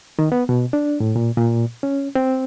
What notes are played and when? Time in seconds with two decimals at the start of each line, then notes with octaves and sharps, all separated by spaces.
0.19 D#3
0.32 B3
0.49 B2
0.73 D4
1.00 A2
1.16 A#2
1.37 A#2
1.83 C#4
2.15 C4